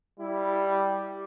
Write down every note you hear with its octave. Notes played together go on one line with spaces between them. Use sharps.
G3 E4
G4